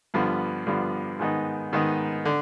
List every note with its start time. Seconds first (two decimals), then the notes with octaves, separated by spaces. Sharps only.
0.14 G2 D3 F3 B3
0.67 G2 D3 F3 B3
1.19 G#2 D#3 B3 D#4
1.72 G#2 D#3 B3 D#4
2.25 D3